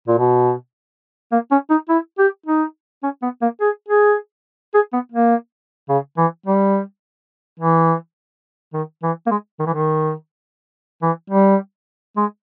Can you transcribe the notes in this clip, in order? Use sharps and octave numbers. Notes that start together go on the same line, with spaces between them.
A#2
B2
A#3
C#4
D#4
E4
G4
D#4
C#4
B3
A#3
G#4
G#4
G#4
B3
A#3
C#3
E3
G3
E3
D#3
E3
A#3
G#3
D#3
E3
D#3
E3
G3
G#3